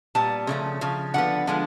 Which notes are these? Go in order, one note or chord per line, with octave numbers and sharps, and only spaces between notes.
A#2 G3 B3 A5
C#3 F3 A3 C#4
C#3 F3
D3 F3 B3 F#5
D3 F3 G#3 B3